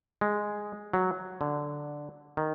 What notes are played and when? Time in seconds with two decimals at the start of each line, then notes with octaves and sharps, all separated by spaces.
0.21 G#3
0.93 F#3
1.41 D3
2.37 D#3